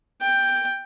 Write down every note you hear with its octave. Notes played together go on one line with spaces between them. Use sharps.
G5